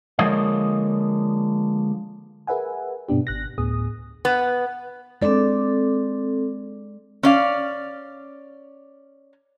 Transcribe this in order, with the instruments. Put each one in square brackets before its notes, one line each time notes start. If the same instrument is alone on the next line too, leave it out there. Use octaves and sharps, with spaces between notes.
[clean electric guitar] D3 F3 G#3 A#3 C#5 D#5
[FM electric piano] G#4 A#4 B4 E5 F#5 G#5
G2 B2 B3 D4 G4
G#1 F#6 A#6
D2 A2 B3 G#4 D#6
[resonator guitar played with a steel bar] B3
[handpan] G#3 D5 [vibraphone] C4 A4
[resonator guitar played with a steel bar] C#4 D5 F5